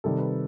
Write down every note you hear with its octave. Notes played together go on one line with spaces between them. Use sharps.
C3 D#3 G3 A4
B4